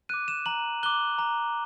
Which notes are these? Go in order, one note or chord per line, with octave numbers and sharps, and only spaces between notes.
D6 F#6 D#7
E7
A#5 F#7
D6 F#6 G7
A#5